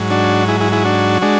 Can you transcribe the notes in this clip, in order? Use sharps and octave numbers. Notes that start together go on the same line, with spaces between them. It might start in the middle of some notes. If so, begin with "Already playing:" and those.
Already playing: G#2 F#3
D4 F#4
E4 G#4
E4 G#4
E4 G#4
D4 F#4
G#3 D4 F#4